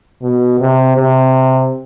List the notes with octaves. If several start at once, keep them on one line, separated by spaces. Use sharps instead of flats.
B2
C3
C3